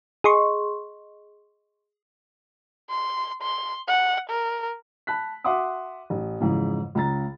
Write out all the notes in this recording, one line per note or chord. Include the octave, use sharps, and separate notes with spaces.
G#4 D#5 C6 C#6
C6
C6
F#5
A#4
A5 B5 F#6 B6
F#4 E5 F#5 C6 D6 D#6
A1
F2 G#2 C#3 E3
C#2 C#3 A#5 A6